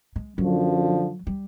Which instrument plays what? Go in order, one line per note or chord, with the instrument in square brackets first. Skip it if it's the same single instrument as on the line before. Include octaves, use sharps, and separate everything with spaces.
[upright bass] G#3
[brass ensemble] F#2 D3 F3 [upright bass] F#3
[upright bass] G3